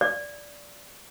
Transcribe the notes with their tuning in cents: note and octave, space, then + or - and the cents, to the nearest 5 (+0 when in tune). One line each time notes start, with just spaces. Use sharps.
D5 -10